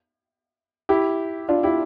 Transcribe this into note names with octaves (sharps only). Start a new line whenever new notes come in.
E4 G4
D4 F4
E4 G4